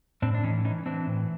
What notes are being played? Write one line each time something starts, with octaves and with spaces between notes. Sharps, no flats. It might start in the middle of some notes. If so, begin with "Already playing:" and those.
A2 C4 D4
D4
E3 C#4 D#4
E3 C#4 D#4
E3 C4 D4
A2